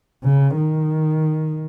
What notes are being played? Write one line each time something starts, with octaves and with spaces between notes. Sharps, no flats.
C#3
D#3